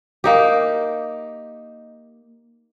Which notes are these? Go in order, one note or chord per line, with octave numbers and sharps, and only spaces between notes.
A#3 D#4 G4